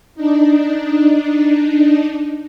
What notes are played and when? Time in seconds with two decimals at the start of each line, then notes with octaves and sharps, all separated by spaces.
0.15 D4 D#4